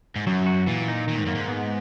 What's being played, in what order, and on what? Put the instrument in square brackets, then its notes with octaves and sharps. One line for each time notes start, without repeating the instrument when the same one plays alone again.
[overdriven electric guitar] G#2
[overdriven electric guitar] F#2 [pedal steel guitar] F#3
[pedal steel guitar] F#4
[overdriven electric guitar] A#2 [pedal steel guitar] E3
[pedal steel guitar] D#4
[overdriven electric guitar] A#2 [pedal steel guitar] D#3
[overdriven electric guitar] G#2
[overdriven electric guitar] F#2 [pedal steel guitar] A#3
[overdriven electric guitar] G#2
[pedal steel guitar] B3